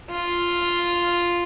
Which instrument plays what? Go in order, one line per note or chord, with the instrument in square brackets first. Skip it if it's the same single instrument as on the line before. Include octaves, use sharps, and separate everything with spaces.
[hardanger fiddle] F4